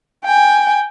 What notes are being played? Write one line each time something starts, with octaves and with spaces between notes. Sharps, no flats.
G5 G#5